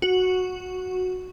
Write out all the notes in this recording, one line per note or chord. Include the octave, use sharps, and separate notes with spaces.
F#4